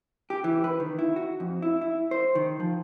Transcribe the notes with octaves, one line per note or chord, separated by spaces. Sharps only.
G4
E3
B4
D#3
E4
F#4
F2
E4
E4
C5
D#3
F3